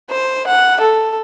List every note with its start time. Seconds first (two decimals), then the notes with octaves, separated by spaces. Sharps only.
0.10 C5
0.47 F#5
0.81 A4